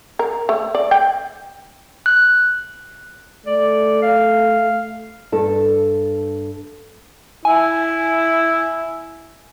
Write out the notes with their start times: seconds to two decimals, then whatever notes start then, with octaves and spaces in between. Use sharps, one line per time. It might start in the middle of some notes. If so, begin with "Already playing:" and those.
0.19 A#4
0.49 A3
0.75 D5
0.91 G5
2.06 F#6
3.46 A3 D5
4.02 F5
5.32 G2 A4
7.45 E4 G#5